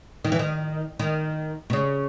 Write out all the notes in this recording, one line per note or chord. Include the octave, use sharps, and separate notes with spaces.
D#3
E3
D#3
D#3
B2
C#3